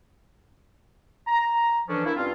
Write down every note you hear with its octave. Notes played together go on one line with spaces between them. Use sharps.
A#5
D3 E3 F3 C#4 D4
A#3 D4 E4
G2 C4 C#4 F4